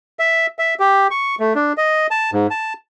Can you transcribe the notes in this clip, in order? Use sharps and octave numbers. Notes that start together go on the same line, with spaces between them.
E5
E5
G4
C#6
A3
D4
D#5
A5
G#2
A5